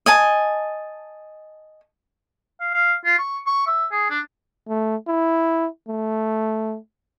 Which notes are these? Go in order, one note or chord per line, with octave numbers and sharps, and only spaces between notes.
D#5 G#5 A5
F5
F5
F4
C#6
C#6
E5
G#4
D4
A3
E4
A3